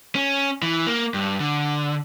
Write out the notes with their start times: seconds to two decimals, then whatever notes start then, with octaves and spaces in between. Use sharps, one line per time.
0.15 C#4
0.62 E3
0.87 A#3
1.14 G2
1.40 D3